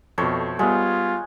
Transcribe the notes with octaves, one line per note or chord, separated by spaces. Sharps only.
F2 B2 A3 C5 C#5
G3 G#3 B3 F4